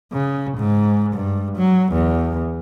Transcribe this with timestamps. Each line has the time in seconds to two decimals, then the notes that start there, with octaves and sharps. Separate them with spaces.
0.13 C#3
0.58 G#2
1.13 G2
1.57 F#3
1.92 E2